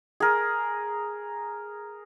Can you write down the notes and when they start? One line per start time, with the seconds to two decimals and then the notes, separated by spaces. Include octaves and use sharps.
0.20 G#4 A#4